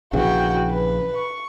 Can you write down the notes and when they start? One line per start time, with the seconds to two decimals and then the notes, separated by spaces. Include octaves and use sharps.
0.13 A#1 C#3 E3 F#4 G5
0.70 B4
1.15 C#6